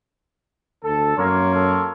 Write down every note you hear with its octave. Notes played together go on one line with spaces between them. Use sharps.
D2 A4
F#2 A#3 A#4 C#5 C6
A4